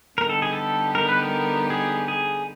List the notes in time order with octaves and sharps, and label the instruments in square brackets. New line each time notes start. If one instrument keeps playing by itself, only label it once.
[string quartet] D3 G3 B3 D#4 G4 [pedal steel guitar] A#4
[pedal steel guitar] A4
G#4
A4
A#4
B4
A#4
G#4
G#4